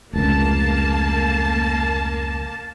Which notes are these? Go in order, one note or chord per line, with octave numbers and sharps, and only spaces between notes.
F1 C#2 A#3 A5